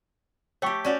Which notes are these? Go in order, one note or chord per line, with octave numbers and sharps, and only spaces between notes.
A3 G4 C#5 G5 C#6
C#4 F#4 G4 D5